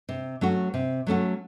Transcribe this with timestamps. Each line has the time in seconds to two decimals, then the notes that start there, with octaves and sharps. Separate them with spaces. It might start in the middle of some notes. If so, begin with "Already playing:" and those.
0.09 C3
0.41 F#3 A3 C#4 F#4
0.74 C3
1.07 F#3 A3 C#4 F#4